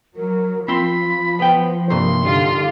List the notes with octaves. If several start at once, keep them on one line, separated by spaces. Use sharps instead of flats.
F#3 A#4
F3 C4 F4 B5 C6
B3 C5 G5
C2 G2 A#3 C6
D3 D#3 G3 F4